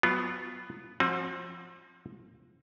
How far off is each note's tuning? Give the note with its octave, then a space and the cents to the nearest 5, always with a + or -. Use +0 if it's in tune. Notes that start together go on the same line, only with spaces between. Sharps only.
F#3 +0 B3 +10 F4 -10
F3 +0 C4 +35 F#4 -25